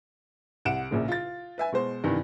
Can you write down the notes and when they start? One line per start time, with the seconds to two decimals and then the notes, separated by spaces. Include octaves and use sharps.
0.65 C2 F#5 D7 E7
0.91 A#1 A#2 C#3
1.08 F4 A6
1.58 B4 E5 G#5
1.72 B2 G#3 C5
2.04 G2 C3 D#3 E3